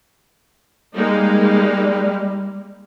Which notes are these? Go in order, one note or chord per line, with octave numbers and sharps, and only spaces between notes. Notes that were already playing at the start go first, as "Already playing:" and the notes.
G3 G#3 A#3 D#4